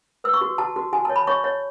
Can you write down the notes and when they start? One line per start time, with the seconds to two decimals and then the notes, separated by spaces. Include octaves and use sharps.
0.24 B4 E6
0.34 C#6
0.41 F#4
0.58 F#4 A5
0.76 F#4
0.93 F#4 G#5
1.05 C#5 A5
1.16 B5
1.27 C#5 C#6
1.44 C#5